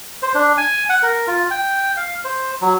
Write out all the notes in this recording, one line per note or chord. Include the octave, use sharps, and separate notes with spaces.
C5
D4
G#5
F#5
A#4
F4
G5
F5
C5
F#3